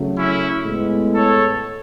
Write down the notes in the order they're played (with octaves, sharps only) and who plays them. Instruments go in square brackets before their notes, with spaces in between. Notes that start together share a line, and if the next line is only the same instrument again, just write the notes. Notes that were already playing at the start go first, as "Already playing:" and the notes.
Already playing: [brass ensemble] C#3 F#3 A3
C#4 E4
A2 G#3 B3
A4 C#5